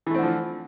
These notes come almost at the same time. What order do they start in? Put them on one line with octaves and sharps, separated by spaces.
E3 A3 C4 D3 F3